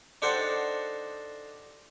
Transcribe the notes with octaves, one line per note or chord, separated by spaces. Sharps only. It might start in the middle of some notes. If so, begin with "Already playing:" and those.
D4 D#4 A4 C5 F#5 G5